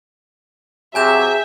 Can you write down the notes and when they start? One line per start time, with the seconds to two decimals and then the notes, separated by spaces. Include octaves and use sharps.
0.95 C3 F#3 G#4 E5 G#5 G6 E7